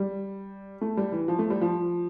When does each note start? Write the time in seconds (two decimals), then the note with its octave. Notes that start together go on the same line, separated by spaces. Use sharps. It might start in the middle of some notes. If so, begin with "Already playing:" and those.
Already playing: G3
0.81 A3
0.97 G3
1.12 E3
1.28 F3
1.39 A3
1.50 G3
1.61 F3